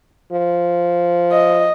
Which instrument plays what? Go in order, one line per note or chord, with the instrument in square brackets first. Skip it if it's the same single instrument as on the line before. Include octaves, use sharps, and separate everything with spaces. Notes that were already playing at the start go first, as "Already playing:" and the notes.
[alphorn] F3
[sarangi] D#5